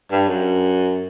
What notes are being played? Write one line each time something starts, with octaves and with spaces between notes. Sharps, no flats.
G2
F#2